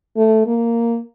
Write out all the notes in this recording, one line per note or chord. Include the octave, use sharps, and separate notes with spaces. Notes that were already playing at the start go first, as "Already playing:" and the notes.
A3
A#3